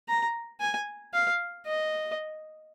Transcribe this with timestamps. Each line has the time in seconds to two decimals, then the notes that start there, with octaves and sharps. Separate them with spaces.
0.08 A#5
0.60 G#5
1.13 F5
1.66 D#5